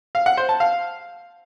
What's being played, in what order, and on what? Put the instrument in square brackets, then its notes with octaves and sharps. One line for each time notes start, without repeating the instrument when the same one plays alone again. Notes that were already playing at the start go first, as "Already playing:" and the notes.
[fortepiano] F5
F#5
C5
A5
F5